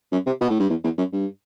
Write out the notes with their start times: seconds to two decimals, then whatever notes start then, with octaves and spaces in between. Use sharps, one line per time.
0.12 F#2
0.26 C3
0.41 B2
0.50 A2
0.60 G2
0.70 E2
0.83 E2
0.98 F#2
1.13 G2